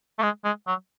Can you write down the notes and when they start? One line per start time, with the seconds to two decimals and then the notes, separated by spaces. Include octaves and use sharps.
0.19 A3
0.23 G#3
0.45 G#3
0.67 F#3